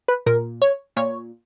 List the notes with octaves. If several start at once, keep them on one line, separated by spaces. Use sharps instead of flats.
B4
A#2 A#4
C#5
A#2 C#5